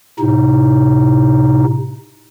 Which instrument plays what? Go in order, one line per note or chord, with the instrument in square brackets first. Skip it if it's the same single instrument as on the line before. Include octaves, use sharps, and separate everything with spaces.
[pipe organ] A2 C3 D#4